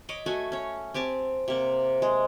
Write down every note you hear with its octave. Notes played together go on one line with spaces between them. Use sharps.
C#5 D#5 B5 D6
A3 F#4 E5 G#5
C#4 C#5
C4 G4 G#5 A5
C3 A#3
G#3